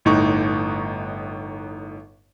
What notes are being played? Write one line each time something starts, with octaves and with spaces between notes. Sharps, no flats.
G1 A2 D#4 C#6